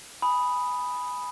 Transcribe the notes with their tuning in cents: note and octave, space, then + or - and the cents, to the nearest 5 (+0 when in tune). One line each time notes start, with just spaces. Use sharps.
G#5 +0 B5 +0 D#6 +0